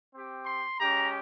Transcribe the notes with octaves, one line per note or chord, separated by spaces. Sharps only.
C4 G4
C6
G#3 C#4 G4 A#5